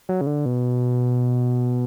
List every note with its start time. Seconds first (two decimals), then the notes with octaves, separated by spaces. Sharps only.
0.09 F#3
0.21 C#3
0.27 D3
0.46 B2